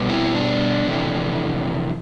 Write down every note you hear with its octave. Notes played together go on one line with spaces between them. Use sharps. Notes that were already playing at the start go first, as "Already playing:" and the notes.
Already playing: B2 G3 B3
C4 E4
D4
F2 C3 E3 A3